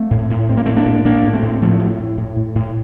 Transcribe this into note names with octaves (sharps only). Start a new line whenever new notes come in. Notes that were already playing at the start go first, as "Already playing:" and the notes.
Already playing: A3 C4
A2
A2
A2 C4
A#3
A2 A3 C4
A#3 D4
A2
A2 A#3 D4
A2
A3 C4
A2
A2 F3 A3
A2
A2
A2
A2
A2